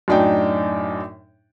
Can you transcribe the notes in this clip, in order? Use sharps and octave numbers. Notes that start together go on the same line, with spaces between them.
F#2 A2 D4 D#4 G5